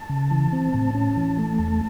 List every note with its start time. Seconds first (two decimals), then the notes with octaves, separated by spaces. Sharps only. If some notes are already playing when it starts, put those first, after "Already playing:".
Already playing: A5
0.10 C#3
0.31 E3
0.53 C4
0.74 A2
0.95 C#4
1.16 E3
1.38 A3
1.58 E2 A5